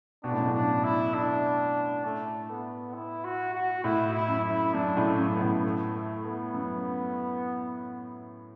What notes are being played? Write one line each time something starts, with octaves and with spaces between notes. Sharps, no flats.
B2 D4
A2
F#2
A2
D4
E4
D4
A3
B3
E4
F#4
F#4
A2 E4
E4
F#2
E4
F#2 D4
A2
A3
F#2
B3
A2
A3
A3
B3
F#2